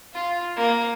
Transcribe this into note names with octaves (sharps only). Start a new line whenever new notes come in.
F4
A#3